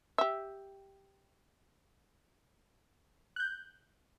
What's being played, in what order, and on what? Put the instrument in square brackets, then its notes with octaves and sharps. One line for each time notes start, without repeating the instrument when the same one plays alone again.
[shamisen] G4 E5
[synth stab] F#6 G6